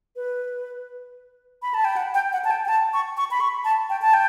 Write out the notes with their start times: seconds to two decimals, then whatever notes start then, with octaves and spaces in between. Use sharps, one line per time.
0.16 B4
1.62 B5
1.74 A5
1.85 G5
1.97 F#5
2.14 G5
2.33 F#5
2.44 A5
2.51 G5
2.65 G5
2.69 A5
2.94 C#6
3.17 C#6
3.31 B5
3.40 C#6
3.65 A5
3.90 G5
4.02 A5
4.14 G5